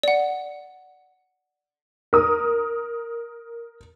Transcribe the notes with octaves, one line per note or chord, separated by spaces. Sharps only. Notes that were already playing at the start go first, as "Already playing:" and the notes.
D5 F#5
A#4 D#6